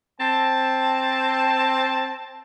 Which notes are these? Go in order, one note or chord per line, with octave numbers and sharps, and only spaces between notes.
C4 A5